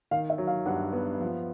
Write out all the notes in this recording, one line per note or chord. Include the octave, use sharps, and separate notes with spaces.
D#3 F5
E5
F#3
F5
G2 F#5
B3
F3